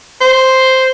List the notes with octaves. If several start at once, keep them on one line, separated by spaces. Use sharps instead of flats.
C5